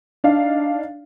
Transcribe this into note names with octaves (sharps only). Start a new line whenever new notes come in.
D4 D#4 F5